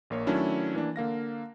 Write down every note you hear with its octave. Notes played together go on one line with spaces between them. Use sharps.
A#1 A#3 C#5
D#3 F#3 A3 C#4 D4 E4
E3 A#3 D4
D3 A#3 F5 A#6